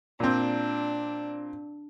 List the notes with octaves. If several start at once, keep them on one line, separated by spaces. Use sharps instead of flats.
A#2 C4 D4